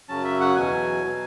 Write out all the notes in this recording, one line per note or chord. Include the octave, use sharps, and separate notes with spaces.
F#2 C#3 F#3 C#4 A5
E5
F#5
E2 B2 F#3 G#5
B2 F#3